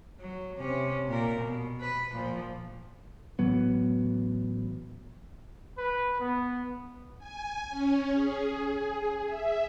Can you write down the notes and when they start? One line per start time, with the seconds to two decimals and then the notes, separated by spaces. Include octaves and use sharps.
0.20 F#3
0.57 C3 C#4
1.08 A#2 A#4
1.41 B2
1.81 B4
2.12 A#2 F3
3.39 A1 A2 F#3 B3
5.78 B4
6.20 B3
7.19 G#5
7.70 C#4
8.13 G#4
9.25 E5